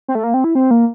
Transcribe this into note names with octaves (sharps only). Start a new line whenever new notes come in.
C4
A3
A#3
C4
E4
C4
A#3